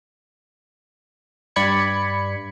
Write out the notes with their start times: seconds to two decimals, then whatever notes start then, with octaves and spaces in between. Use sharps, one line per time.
1.56 G2 D5 B5 G#6 C#7